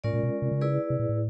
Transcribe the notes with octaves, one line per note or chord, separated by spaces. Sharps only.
A2 G#3 C#4 F4 A#4 D5
A#2
B2
C3
C#3
E4 G#4 B4 D5
C3
A#2
A2